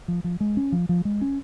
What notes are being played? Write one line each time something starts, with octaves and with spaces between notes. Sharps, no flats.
F3
F3
G#3
C#4
F3
F3
G#3
C#4